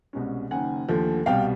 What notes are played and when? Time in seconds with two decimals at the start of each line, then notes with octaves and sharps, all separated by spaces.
0.13 C2 B2 G#3 C#4
0.51 F#1 F#2 D#3 F#5 G#5
0.89 D#2 D3 F3 A3
1.26 C2 B2 G3 F5 G5